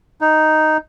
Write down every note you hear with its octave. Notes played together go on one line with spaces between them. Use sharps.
D#4